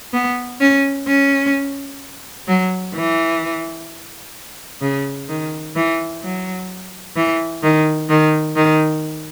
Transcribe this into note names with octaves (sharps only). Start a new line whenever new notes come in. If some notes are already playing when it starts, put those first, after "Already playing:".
B3
C#4
C#4
F#3
E3
C#3
D#3
E3
F#3
E3
D#3
D#3
D#3